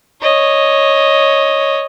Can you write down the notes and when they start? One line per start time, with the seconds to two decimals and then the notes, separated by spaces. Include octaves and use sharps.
0.22 C#5 D#5